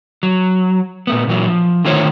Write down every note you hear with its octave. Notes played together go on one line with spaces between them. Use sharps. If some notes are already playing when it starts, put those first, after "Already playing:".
F#3
A#2 A3 B3
A#2 E3 F#3
F3
D3 D#3 A3 F4 C5 C#5